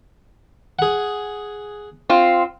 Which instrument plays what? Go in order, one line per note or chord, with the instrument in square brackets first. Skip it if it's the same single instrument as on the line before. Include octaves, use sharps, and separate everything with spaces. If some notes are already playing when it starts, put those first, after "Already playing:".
[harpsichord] G#4 F#5
[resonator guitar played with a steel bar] C4 F4